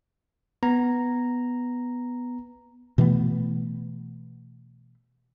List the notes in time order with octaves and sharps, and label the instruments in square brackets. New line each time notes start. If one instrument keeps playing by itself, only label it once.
[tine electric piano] B3 A#5
[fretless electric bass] B2 E3 A3 B3